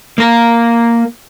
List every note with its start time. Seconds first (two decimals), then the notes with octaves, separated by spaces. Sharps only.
0.18 A#3 A#4